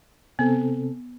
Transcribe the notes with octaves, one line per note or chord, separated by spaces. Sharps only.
C3 B3 C4 A4